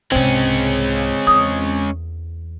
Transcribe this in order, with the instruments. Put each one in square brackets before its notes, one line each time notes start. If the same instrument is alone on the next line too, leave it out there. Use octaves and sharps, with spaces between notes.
[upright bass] C2 G#2 [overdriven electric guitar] G#3 C#4 [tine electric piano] C4
[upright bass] E2 [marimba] D#6